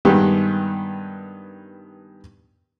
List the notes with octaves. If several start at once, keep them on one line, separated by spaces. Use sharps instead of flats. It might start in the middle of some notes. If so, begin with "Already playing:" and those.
G2 D#3 G#3 B3 G4